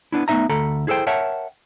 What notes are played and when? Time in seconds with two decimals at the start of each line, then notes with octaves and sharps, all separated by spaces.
0.12 B3 D4 E4
0.28 A3 B3 D#4 E5 A#5
0.49 D2 A4 A#5 B5
0.87 E4 G#4 A4 C5 G5
1.07 A#4 C#5 E5 F#5 G5 A5